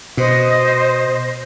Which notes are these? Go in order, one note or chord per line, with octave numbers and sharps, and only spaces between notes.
B2 C5 D#5